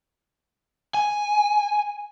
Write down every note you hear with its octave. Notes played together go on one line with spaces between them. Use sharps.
G#5